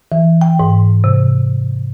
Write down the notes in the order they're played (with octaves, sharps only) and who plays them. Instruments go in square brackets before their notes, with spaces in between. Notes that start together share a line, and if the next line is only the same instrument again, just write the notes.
[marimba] E3
G5
G#2
C3